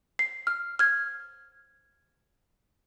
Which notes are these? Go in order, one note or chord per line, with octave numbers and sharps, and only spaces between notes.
C7
F6
F6 G#6